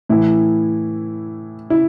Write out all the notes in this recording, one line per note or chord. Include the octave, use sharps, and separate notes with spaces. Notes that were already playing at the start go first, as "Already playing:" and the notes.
A2 E3 E4
E4